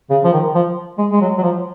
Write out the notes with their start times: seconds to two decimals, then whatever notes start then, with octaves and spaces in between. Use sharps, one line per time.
0.10 C#3
0.24 F3
0.32 D#3
0.55 F3
0.98 G#3
1.12 G#3
1.21 F#3
1.38 F#3
1.43 F3